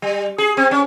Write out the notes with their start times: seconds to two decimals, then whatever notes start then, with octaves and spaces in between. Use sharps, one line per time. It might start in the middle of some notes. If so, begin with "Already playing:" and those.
0.02 G3
0.38 G#4
0.57 C4
0.71 C#4